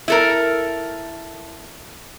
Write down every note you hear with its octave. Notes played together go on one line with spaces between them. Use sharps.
E4 A4 A#4